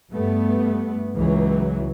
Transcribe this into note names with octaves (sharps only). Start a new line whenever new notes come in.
G2 A3 B3
C#2 E3 F#3